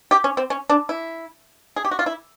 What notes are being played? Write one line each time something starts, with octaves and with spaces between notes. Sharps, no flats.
G4
C#4
C4
C#4
D4
E4
G#4
G4
F#4
F4
E4